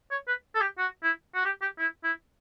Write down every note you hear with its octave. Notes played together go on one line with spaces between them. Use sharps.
C#5
B4
A4
G4
F#4
E4
F#4
G4
G4
E4
E4